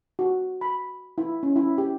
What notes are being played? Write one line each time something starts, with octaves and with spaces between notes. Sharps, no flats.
F#4
B5
E4
C#4
E4
G4